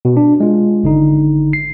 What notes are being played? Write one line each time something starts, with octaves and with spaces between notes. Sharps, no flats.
B2
D4
G#3 F4
G#1 D3 D#4
C7